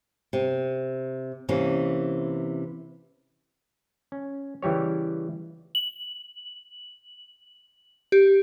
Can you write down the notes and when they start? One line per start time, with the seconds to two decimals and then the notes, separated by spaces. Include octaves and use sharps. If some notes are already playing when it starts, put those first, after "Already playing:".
0.33 C3
1.49 C3 E3 A#3 C#4
4.12 C#4
4.62 C#3 E3 G3 G4 C#5
5.75 F#7
8.12 G4